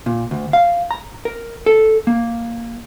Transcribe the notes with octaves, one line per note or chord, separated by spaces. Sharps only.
A#2
D2
F5
A#5
A#4
A4
A#3